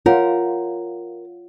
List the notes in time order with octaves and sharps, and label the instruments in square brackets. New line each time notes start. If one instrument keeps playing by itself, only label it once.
[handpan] F4 [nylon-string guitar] A#4 [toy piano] C#5 F5 F#5